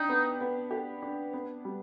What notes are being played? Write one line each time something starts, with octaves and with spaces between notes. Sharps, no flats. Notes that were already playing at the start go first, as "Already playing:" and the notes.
Already playing: D4 D#4 G4
B3
B3
G4
D4
B3
G3